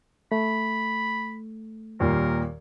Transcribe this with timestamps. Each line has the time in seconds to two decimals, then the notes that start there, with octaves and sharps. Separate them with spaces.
0.32 A3 B5
2.00 D#2 A#2 G3 A#4